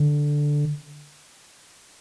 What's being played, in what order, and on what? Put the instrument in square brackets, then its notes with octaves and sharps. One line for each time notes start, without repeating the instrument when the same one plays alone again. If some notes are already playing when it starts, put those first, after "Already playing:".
Already playing: [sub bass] D3